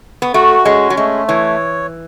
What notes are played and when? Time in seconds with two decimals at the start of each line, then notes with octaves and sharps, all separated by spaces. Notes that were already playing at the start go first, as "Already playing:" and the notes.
0.22 B3
0.34 A3 F#4
0.65 G#3 C#4
0.90 F#3
0.97 G#3 A3
1.28 E3 C#5